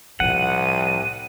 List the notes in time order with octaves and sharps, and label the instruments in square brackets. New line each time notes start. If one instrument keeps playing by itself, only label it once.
[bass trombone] C2 [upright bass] A2 F3 [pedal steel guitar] F#5 [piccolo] D#7